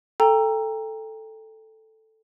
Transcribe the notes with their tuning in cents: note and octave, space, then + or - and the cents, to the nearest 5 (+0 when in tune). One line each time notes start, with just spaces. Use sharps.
A4 +0 G5 +25 A#5 +0